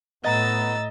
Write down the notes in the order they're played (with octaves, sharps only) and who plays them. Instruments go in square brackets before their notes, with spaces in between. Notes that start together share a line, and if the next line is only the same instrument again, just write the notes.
[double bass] A2 [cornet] B3 [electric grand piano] D#5 A#5 [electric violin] E6 A6